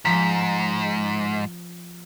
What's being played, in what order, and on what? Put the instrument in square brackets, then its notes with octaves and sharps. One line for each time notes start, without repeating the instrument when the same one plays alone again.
[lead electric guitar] G#2 [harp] F3 A#5 B6